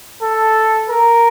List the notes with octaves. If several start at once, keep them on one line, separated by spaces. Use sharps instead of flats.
A4
A#4